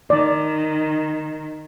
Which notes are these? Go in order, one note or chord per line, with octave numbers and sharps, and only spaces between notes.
D#3 D5